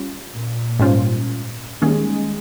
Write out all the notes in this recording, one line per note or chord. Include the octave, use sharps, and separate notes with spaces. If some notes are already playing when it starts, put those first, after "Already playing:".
Already playing: G3 C#4 F4
A#2
G#2 G3 C#4 F4 C5
D#3 G3 G#3 A#3 C#4 G#4